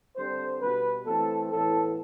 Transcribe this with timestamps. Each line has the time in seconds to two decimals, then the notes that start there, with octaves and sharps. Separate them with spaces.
0.16 D3 G3 C4 C5
0.62 B2 G3 B3 B4
1.06 E3 A3 C4 A4
1.51 A2 E3 B3 A4